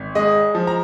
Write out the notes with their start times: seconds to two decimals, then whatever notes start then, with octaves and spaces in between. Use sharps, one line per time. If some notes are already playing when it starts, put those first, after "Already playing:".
Already playing: G#1
0.15 G#3 D#5
0.55 F3
0.67 A#5